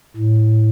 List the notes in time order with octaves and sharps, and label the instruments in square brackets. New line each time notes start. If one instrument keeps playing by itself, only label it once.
[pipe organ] A2